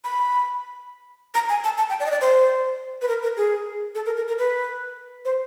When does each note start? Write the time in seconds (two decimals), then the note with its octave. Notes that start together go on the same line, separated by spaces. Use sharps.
0.04 B5
1.34 A#5
1.49 G#5
1.64 A5
1.78 A5
1.90 G5
2.00 D5
2.06 D#5
2.11 D5
2.21 C5
3.02 B4
3.08 A#4
3.23 A#4
3.37 G#4
3.95 A4
4.06 A#4
4.17 A#4
4.28 A#4
4.38 B4
5.25 C5